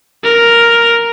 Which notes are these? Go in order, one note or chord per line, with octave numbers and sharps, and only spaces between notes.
A#4